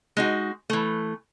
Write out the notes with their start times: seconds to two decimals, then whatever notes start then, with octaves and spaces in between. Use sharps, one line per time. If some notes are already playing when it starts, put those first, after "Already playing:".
0.17 G#3 D#4 F#4
0.70 E3 A3